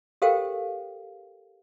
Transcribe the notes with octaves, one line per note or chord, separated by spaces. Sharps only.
G4 A4 A#4 C5 F5 G5